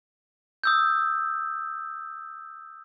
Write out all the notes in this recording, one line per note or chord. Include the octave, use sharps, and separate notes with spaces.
D#6 E6 G6